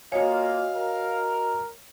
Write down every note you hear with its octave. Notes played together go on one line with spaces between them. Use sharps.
A#3 F4 F#4 C#5 D#5 F5 G#5
A#4